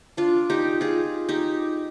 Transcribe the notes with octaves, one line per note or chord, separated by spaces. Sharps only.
D4 F4
D#4 G4
F4 G#4
D#4 G4